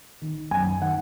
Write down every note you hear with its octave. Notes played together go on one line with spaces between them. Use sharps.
D#3
F#2 G#5
D#3 F#5